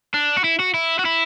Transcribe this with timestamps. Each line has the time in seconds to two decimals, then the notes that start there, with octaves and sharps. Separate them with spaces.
0.14 D4
0.37 F#4
0.44 E4
0.59 F#4
0.74 E4
0.99 F#4
1.05 E4